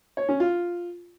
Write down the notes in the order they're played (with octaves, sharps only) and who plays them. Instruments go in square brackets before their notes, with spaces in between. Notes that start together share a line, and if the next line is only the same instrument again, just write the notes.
[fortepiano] C#5
C#4
F4